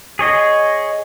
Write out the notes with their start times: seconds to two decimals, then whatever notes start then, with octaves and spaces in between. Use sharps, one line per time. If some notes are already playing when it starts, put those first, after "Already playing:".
0.19 G#4 C#5 D#5